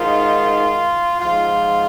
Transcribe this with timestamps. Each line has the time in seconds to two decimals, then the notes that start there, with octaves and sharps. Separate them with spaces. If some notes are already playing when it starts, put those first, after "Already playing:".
Already playing: G#2 D#3 F4
1.21 G#2 F3 F4